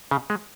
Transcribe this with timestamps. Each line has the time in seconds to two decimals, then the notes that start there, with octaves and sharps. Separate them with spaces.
0.11 C#3
0.30 G#3